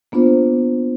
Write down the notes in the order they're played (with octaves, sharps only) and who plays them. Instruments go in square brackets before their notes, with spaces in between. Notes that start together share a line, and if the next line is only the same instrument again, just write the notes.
[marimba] A#3 B3 D4 F4 C5